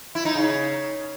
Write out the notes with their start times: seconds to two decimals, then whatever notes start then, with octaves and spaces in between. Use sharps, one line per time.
0.15 E4
0.25 D#4
0.35 C#3